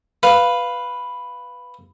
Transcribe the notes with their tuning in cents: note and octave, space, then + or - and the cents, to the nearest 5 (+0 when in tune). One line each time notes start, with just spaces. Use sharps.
B4 +0 F5 +0